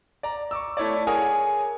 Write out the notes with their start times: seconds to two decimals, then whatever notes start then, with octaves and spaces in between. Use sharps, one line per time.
0.23 D5 A#5
0.51 C#6 D6 E6
0.77 A3 E4 C#5 D5
1.07 G#4 A#4 C#5 F#5 G#5 D#6